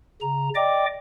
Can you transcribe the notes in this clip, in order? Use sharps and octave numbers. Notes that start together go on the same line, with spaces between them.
C#3 A#5
D5 D#5 G5 D6